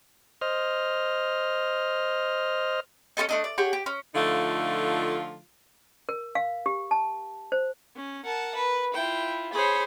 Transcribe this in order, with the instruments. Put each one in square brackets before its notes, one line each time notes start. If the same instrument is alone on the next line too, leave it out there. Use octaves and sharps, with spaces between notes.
[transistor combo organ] C5 D#5 F6
[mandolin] C#4 F4 A4 D#5
A3 D4 D#5
D5
G4 G#4 C#5 F#5
G4
C#4
[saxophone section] D3 F3 A3 D#4 F4
[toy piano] A#4
F5
G4
A5
C5
[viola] C#4
[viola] A#4 [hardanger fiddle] F#5 A5
[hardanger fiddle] B4
[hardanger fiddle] E4 F4 [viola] G5
[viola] G#4 C5 [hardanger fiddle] C#5 B5